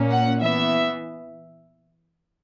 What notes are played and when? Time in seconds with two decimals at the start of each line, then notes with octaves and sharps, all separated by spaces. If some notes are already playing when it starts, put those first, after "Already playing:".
Already playing: A#2 A#3 C#4
0.11 F#5
0.41 E3 B3 E5